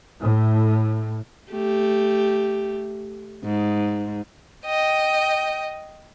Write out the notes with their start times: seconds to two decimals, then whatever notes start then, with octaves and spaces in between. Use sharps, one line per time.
0.21 A2
1.52 A3 G4
3.44 G#2
4.65 D#5 G5